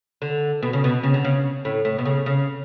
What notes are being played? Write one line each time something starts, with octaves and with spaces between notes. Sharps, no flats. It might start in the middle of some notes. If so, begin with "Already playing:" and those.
D3
B2
C#3
B2
C#3
D3
C#3
A2
A2
B2
C#3
C#3